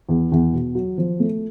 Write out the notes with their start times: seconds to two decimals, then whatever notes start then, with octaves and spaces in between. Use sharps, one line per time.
0.09 E2
0.32 E2
0.53 B2
0.75 F#3
0.98 F3
1.20 A3